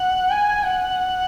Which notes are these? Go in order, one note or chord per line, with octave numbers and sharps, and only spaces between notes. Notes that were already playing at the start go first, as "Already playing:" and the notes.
Already playing: F#5
G#5
F#5